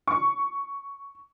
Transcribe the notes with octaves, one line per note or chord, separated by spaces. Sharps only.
C#6